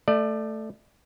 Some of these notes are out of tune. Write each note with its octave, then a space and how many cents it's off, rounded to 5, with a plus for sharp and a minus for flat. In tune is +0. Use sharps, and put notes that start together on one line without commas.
A3 +0 D5 +30